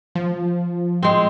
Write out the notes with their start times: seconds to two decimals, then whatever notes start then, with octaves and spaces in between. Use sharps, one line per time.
0.15 F3
1.03 G#3 C4